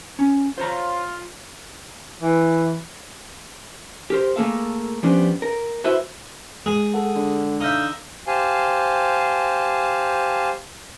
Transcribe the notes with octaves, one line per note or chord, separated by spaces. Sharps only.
C#4
F4 C5 C#5 A#5
E3
G4 A#4 C5
A3 A#3 G#4 A4 F5
F3 G3 B3 C#4 D4
A#4
E4 F#4 B4 C5 E5
G#3 G#4
A4 F#5
D3
D#4 E5 F5 F6 G6
G4 C5 F5 G#5 A5